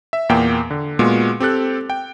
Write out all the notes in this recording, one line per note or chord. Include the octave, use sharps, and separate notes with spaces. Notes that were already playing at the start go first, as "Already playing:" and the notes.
E5
E2 A#2 A#3 B3 G5
D3
A#2 G#3 B3 F4 F#4
C4 G4 A4 F#6
G5